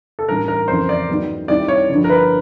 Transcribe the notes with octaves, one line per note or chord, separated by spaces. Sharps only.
A4
A1 G2 D#3 G3 A#4
A#4
F2 C#3 E3 C5
D5
G#2 D#3 F#3 B3
D#2 D#3 G3 C4 E4 D5
C#5
G1 G2 D3 F3
A#4
B4